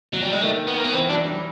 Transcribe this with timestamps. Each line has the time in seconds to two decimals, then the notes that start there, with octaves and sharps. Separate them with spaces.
0.14 F#3
0.23 G3
0.33 G#3
0.42 D#3 A3
0.68 B3
0.78 A#3
0.85 B3
0.93 E3 C4
1.10 F#3 D4
1.26 G3